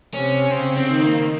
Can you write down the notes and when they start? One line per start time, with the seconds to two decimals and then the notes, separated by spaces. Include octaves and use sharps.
0.14 C3 C#4
0.51 C#3 C4
0.77 C4
0.89 D#3
1.01 A#3